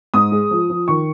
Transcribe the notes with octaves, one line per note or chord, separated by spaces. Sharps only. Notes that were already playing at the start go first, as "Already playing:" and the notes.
G#2 D#6
G#3
F3
F3
D#3 C#6